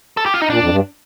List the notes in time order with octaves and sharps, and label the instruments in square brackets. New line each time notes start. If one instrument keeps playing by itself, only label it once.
[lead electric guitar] A4
G4
F4
D#4
[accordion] A#2 [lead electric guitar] D4
[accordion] F2
G2